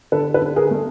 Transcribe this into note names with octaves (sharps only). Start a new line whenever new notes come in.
D3 A4 B4
A4 B4
D3
G#4 A#4
A3